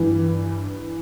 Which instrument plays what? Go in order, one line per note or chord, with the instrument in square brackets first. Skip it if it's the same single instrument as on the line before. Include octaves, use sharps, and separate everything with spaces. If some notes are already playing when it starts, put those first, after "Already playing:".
Already playing: [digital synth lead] G2 [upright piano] E3